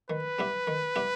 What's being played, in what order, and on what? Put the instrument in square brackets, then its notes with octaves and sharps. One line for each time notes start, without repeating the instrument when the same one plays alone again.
[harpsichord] D#3 [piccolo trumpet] B4
[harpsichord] G3 B3 E4 G4
D#3
G3 B3 E4 G4